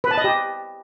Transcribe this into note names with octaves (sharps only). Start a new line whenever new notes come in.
B4
A5
D#5
G4